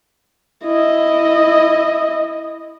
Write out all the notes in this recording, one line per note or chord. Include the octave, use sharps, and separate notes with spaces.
E4 D#5